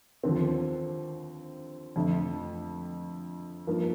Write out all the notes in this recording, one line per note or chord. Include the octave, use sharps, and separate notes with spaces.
D#2 D3 F3 C4
F2 D3 A3
G2 F3 A#3 D#4